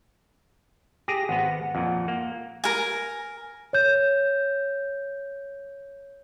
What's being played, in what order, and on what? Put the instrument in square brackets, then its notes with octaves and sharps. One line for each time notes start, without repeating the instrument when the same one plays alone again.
[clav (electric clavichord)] G4 G#4 [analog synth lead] A#6
[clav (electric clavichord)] G#1 B3 [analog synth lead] F#5
[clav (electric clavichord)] F2 A#2
A#3
[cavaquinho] A#4 G#5
[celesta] C#5 G6